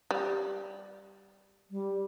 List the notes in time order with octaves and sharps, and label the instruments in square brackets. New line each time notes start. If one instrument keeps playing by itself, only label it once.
[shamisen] G3
[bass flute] G3